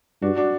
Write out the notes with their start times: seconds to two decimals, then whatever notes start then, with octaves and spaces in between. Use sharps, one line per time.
0.22 G2 D4 F#4
0.36 D4 F#4